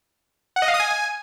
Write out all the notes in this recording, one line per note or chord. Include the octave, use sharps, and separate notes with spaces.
F#5
D#5
F5
D#6
G#5